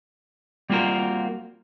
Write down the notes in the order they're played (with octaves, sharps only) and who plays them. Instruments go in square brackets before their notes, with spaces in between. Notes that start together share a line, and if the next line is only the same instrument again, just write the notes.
[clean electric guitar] G3 A#3 C4 F4 F#4 A#4